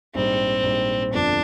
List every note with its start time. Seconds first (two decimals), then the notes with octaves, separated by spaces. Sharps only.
0.14 A#1 G#2 G3 C4
0.63 A#1 G#2 G3
1.12 G1 F2 D3 F3 D4